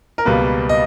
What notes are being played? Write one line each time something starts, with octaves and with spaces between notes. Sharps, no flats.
A#4
C#2 B2 G3 A#3 B4
D#5